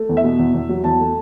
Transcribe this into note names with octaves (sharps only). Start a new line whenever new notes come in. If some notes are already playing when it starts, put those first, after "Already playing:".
Already playing: A3
E2
E5
B2
E2
E2
F#3
E2 A5
A3